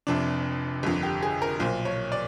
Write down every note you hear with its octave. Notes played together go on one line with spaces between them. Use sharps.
F1 F2 C3 D4
G1 F2 D3
G4
G#4
A#4
B1 A#2 C5
C#5
D5